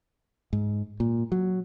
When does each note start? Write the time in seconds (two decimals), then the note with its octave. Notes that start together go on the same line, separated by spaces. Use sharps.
0.53 G#2
1.00 A#2
1.32 F#3